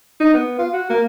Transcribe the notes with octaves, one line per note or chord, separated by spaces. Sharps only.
D#4
B3
F4
F#4
A#3